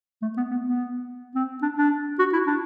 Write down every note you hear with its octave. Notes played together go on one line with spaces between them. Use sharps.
A3
B3
B3
B3
C4
D4
D4
F#4
E4
D4